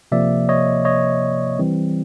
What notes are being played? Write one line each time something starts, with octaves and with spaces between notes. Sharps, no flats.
C3 F3 A#3 D5 E5
C#5 D#5
C#5 D#5
E3 G3 C4